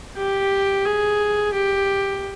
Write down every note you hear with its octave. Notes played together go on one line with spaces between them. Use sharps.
G4
G#4
G4